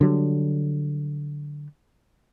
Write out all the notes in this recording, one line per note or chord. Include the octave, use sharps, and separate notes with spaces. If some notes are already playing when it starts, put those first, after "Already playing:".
D3 F#3 G3